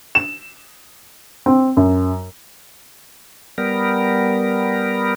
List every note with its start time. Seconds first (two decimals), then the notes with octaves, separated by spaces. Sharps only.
0.15 E7
1.46 C4
1.77 F#2
3.58 G3 B3 A#4